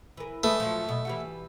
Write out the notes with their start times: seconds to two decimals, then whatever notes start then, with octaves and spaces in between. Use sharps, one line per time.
0.17 E3 A#4
0.43 D2 G#3 A3 B4
0.60 F3 F#3
0.84 F#2 B2
1.05 E3 G3 F#4